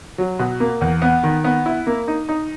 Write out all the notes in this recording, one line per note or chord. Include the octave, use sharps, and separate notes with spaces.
F#3
B2
A#3
E2
B3
D#3
B3
E4
A#3
D#4
D#4